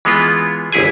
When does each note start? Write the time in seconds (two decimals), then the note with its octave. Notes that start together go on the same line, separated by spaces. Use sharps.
0.05 E3 G#3 B3 F4
0.72 G1 C2 E4 G#4 G#5